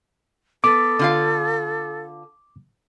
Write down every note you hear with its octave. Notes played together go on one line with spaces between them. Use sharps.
B3 A4 D6
D3 F4 F5